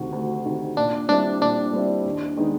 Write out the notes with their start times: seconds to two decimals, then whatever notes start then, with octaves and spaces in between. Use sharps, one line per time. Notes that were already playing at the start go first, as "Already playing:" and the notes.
Already playing: D2 C3 D#3 F#4
0.13 D2
0.45 C3 D#3
0.77 A#2 D4
1.09 G3 C4 D4 E4
1.42 A#2 D4
1.73 G3 C4 E4
2.05 D#2
2.37 D#3 G#3 B3 D#4